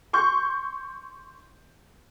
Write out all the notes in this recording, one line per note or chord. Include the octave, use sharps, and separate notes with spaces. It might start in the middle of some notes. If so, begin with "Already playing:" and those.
C6 C#6 G6